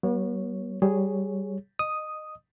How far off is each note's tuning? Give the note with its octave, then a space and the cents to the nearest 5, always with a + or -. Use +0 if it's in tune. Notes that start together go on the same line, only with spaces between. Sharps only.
G3 -45 B3 -45 C#5 +0
G3 -15 G#4 +0 C#5 +0
D#5 -20 D#6 +0